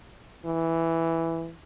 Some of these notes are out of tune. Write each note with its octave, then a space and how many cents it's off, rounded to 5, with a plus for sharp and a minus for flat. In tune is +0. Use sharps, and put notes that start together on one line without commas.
E3 +0